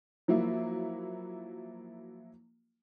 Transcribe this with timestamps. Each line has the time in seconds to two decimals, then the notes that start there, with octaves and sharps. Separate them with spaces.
0.28 F3 F#3 A#3 E4